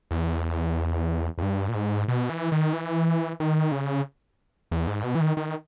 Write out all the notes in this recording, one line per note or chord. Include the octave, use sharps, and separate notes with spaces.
E2
E2
G2
A#2
G#2
B2
E3
D#3
E3
D#3
C#3
E2
G#2
B2
E3
D#3
D#3